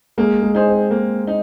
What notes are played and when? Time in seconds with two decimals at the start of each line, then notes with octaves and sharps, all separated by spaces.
0.18 G#3 A#3
0.42 G#3
0.55 D#4 G#4 C5
0.67 C4
0.91 A#3
1.27 D#4